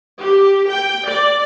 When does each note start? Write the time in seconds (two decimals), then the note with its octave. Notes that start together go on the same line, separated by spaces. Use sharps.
0.18 G4
0.68 G5
1.07 D5